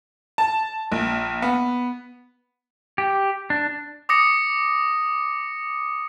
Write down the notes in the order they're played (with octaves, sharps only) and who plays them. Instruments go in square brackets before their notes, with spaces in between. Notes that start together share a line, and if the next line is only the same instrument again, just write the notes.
[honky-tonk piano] A5
A#1
B3
[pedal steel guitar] G4
D4
[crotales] D6 D#6 A#6 C#7